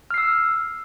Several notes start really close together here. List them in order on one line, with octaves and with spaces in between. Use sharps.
F6 C7 E6